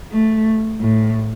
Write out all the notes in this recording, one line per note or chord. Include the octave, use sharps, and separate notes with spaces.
A3
A2